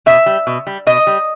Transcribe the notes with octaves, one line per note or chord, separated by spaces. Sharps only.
B2 E5
G3
B2
G3
B2 D#5
G3